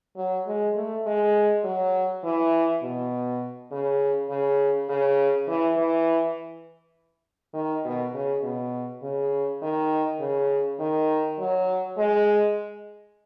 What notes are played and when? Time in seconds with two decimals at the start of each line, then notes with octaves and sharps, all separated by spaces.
0.17 F#3
0.47 G#3
0.76 A3
1.06 G#3
1.64 F#3
2.24 E3
2.83 B2
3.72 C#3
4.30 C#3
4.89 C#3
5.48 E3
5.77 E3
7.54 D#3
7.85 B2
8.14 C#3
8.43 B2
9.03 C#3
9.62 D#3
10.20 C#3
10.80 D#3
11.39 F#3
11.98 G#3